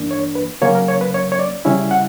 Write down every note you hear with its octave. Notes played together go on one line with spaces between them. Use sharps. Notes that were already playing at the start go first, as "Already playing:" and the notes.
Already playing: G2 E3 A#3 D4
C#5
B4
C#3 F#3 A#3 C#4 C#5
A#4
C#5
B4
C#5
C#5
D5
C#3 G3 C#4 E4 E5
F#5